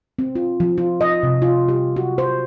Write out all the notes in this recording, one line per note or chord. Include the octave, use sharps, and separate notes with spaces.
C4
F4
F3
F4
D#5
C3
F4
G4
F#4
C5